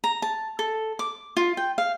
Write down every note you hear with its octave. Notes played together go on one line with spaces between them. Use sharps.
A#5
A5
A4
D6
F4
G5
F5